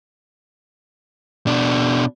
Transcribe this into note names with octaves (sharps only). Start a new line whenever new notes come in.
B2 D4